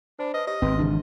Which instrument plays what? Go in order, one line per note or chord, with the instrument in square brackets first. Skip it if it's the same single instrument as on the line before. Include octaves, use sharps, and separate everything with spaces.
[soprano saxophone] D4 [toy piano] C5 G#5 B5
[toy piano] B4 C#5 [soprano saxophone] D#5
[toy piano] G4 [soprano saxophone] D#5
[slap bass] G#1 [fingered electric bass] C4 [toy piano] B4 C6
[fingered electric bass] C#3 E3 D4